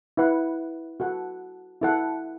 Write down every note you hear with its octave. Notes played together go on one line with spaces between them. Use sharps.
E4 B4 F#5
F#4 A4 F#5
E4 A4 F#5